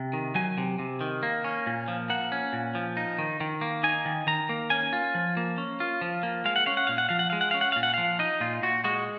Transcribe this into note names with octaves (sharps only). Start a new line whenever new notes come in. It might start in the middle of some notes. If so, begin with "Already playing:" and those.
Already playing: C3
D#3
F#3 G#5
C3
C3
D#3
A#3
C#4
A#2
F3
A#3 F#5
C#4
A#2
F3
D#4
D#3
D#3
A#3
D#4 G#5
D#3
D#3 A#5
A#3
C#4 G#5
F4
F3
A#3
C#4
F4
F3
A#3
G#3 F5
F#5
C#4 F5
F#5
A#2 F5
F#5
F3 F5
F#5
G#3 F5
F#5
C#4 F5
F#5
A#2 F5
F#5
F3 F5
D#4 D#5
A#2 F4
A#2 F#4
G#3 F#4